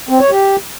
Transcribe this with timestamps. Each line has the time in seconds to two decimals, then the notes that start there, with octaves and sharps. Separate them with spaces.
0.09 C4
0.20 C#5
0.31 G4